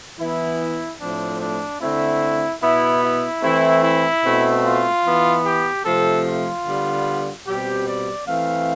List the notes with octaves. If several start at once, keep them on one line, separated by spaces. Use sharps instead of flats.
E3 B3 E4
A2 F3 A3 C4 D4
D4
D3 A3 C4 E4
B2 B3 E4
E4
E3 A3 C4 E4
E4
B2 A3 C4
F4
E3 B3
G4
C3 F3 A3 C4 A4
F4
D3 G3 B3
B2 G3 C4 G4
D5
E3 A3 C4 F5